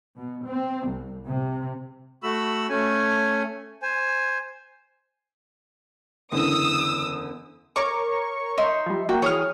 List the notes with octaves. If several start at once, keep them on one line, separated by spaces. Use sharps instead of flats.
B2
C4
C2
C3
A3 F#4 B5 E6
A3 C#4 G#5
C5 G#5
F#1 E2 D3 D#6 E6
A#4 C#5 C#6 D6
D#4 E5 C6
F3 G3
A#3 F#4 G5
E3 G#4 C#5 D#6 F6